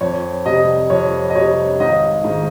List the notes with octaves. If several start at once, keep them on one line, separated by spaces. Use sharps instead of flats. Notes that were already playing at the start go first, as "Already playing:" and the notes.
F2 C#5
C3 G3 D#5
F2 C#5
D#5
C3 G3 C#5
G#1 D#5
G#2 D#3